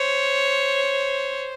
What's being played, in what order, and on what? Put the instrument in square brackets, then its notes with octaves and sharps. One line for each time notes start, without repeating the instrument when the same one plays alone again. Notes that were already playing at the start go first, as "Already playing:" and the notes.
Already playing: [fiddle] C5 [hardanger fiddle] C#5